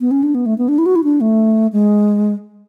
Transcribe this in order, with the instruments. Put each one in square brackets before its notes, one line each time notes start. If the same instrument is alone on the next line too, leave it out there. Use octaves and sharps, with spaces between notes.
[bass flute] B3
C#4
D4
B3
A3
B3
D4
E4
F#4
E4
D4
A3
G#3